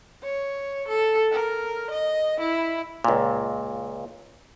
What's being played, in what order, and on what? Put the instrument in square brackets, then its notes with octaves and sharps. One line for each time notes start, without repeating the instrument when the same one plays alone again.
[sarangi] C#5
A4
A#4
D#5
E4
[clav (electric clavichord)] C#2 A#2